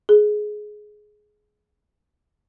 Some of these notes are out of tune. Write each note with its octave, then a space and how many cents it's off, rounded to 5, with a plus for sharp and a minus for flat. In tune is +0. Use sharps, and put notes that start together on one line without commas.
G#4 +15